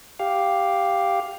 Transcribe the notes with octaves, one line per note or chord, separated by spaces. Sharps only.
G4 F5